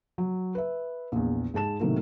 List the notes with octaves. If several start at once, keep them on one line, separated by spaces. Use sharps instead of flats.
F#3
B4 E5
A#1 E2
G#2 G#4 A5 E7
A2 C3 D#3 F#3 A3 A#3